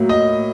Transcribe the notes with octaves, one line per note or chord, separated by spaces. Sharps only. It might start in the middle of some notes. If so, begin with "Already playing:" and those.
Already playing: A2 F#3 A#3
D#5